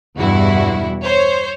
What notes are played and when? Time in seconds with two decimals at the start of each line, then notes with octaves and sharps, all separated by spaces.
0.17 E2 G2 B2 E4 F#4
1.04 C5 C#5